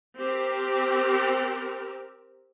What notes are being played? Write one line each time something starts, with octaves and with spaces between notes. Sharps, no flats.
C4 G4 A#4